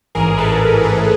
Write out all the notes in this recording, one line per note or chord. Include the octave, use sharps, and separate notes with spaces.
A1 G#2 E3 G#4 A#4
A4 B4
G#4 A#4